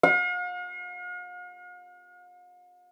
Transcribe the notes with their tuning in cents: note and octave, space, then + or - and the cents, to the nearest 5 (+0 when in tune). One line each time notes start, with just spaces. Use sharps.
F5 +45